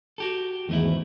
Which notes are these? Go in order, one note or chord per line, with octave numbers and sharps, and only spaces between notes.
F#4 G4 A4
E2 G#2 D#3 A3 E4